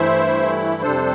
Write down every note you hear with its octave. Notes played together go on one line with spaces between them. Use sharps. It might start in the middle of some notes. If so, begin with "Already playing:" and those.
Already playing: G2 E3 A3 E4 C5 E5
F2 C3 G3 D4 A4 C5